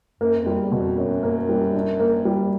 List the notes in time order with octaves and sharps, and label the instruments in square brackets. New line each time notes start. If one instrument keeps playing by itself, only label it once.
[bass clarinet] F#2 [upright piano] A#3
[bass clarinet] F2
[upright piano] G3
[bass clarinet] E2
[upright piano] B2
[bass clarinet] F2
[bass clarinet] F#2 [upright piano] C#4
[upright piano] A#3
G3
D4
A#3
G3